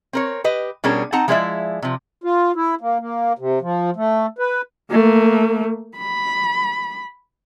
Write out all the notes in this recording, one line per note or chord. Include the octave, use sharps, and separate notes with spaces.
C4 A#4 C#5
G4 B4 D#5
B2 G3 C#4 D4 G#4 A#4
C4 D#4 F#5 A5 A#5
F3 G#3 E4 B4 D5 E5
C3 F3
F4
E4
A#3
A#3
C3
F3
A3
B4
A3 A#3
B5